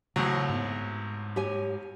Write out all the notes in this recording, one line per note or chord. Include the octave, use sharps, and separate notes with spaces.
C2 A2 C#3 F#3
G#2 B3
G4 C#5 G#5